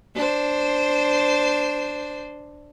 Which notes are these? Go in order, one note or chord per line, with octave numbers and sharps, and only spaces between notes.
D4 C5